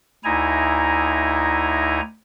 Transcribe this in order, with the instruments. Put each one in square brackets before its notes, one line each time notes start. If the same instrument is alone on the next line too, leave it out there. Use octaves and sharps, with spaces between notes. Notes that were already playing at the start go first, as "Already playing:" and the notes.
[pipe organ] D2 D#4 E4 G#5 A#5